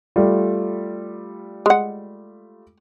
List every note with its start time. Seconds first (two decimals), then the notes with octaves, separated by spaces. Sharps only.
0.16 G3 A3 F4
1.66 G#3 F#5